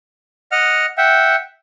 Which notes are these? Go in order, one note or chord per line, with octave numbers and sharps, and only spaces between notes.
D#5 F#5 F6
E5 F#5 G5